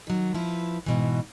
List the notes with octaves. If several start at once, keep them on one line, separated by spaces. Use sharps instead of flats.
D#3 F#3
F3 E4 B4
G#2 B2 E3